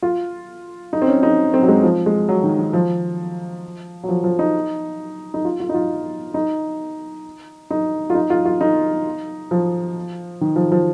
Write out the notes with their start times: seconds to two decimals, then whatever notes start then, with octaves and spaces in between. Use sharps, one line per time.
0.02 F4
0.93 D#4
1.02 C4
1.08 C#4
1.23 D#4
1.54 C4
1.63 F#3
1.68 G#3
1.83 F3
2.06 G#3
2.29 F#3
2.44 D#3
2.58 D#3
2.73 F3
4.03 F#3
4.09 F3
4.24 F3
4.39 D#4
5.34 D#4
5.45 F4
5.60 F4
5.69 D#4
5.74 F4
6.34 D#4
7.70 D#4
8.10 F4
8.15 D#4
8.30 F4
8.45 F4
8.61 D#4
9.51 F3
10.41 D#3
10.56 F3
10.72 F3